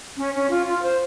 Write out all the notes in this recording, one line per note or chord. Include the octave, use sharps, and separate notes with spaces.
C#4
C#4
F4
F4
C5